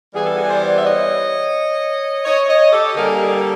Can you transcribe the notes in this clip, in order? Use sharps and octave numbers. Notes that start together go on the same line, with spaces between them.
E3 G3 B3 G#4
A4
F#4 G#4
C5 D5
E5
C#5 D#5
C#5 D#5
C#5 D#5
G4 A4
D3 G3 A#3 G#4 A#4
A#4
G4 A4